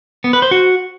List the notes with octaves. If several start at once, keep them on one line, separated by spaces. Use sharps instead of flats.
B3
B4
C5
F#4